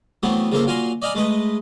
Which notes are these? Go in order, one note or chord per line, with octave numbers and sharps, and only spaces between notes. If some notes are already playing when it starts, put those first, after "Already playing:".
E3 F#3 A3 B3 C4
C#3 F3 A#3 F4 A4
A#2 F#3 F5 G#5 A#5 C6
D5 D#5 F5 G#5 A#5 B5
G#3 A3 B4 D#5